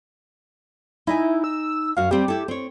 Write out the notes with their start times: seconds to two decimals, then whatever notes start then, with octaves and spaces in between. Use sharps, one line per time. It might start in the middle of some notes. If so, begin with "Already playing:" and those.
1.07 D#4 E4 D#5 G#5
1.44 E6
1.97 F#2 F#4 F5
2.11 G3 C4 G4
2.28 E4 A4
2.48 C4 C#5